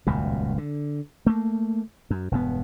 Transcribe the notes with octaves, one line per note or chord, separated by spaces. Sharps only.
D#1 C#2 F#2 B2
D3
A3 A#3
F#2
E1 G2 B3